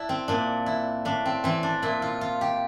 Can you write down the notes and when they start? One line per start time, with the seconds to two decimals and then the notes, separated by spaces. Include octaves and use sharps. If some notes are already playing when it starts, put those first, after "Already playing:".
Already playing: D4 E4
0.09 C4
0.28 A#2 D4
0.66 E4
1.05 A2 D4
1.25 C4
1.44 E3 C4
1.63 D4
1.82 A#2 E4
2.02 F4
2.21 F4
2.41 G4